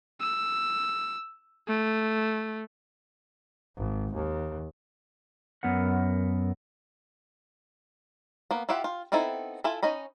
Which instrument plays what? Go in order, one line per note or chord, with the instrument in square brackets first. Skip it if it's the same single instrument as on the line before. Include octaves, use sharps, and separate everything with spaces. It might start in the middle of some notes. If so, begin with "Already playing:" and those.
[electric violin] E6
A3
[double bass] G#1
D#2
[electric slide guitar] F#2 B3 A#4 F#5
[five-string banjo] A#3 B3
E4 F4 G4 E5 F#5
F4
B3 C4 D#4 E4 A4
E4 F4 A4 E5 G#5
C#4 D#4 D#5 B5